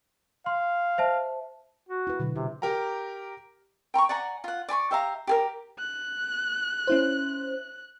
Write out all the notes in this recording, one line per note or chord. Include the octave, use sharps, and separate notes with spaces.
F5 C6
C5 E5 A5
F#4
E4 B4
B2 D3 F#3
C3 E4
G4 A#4 G5 A#5
G5 A#5 C6 C#6
D5 F#5 G#5 A#5
F4 F#5
D5 G#5 B5 C#6
G4 E5 F5 A#5
G4 G#4 A#4
F#6
C#4 E4 C5